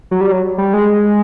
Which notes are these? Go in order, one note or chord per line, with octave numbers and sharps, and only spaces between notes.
F#3
G3
F#3
G3
G#3